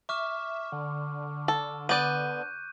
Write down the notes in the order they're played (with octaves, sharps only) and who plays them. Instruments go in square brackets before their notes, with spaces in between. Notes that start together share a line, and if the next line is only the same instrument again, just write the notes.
[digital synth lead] E5 [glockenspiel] C#6 D6 F6
[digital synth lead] D3
[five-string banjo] A4
[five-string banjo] B3 D5 [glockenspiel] F#6 G6 D#7